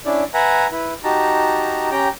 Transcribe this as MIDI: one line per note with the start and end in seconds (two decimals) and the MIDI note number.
0.06 0.24 61
0.06 0.24 62
0.06 0.24 64
0.06 0.24 74
0.34 0.67 71
0.34 0.67 76
0.34 0.67 78
0.34 0.67 80
0.34 0.67 82
0.71 0.94 64
0.71 0.94 71
1.04 1.90 63
1.04 1.90 66
1.04 1.90 67
1.04 1.90 81
1.04 1.90 82
1.91 2.09 61
1.91 2.09 67
1.91 2.09 79
1.91 2.09 82